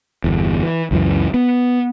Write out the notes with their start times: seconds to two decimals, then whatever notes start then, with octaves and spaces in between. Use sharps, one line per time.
0.24 G1 E2
0.63 E3
0.91 C#2 F#2 E3
1.34 B3